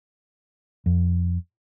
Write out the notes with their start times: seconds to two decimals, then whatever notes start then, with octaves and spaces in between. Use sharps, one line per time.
0.86 F2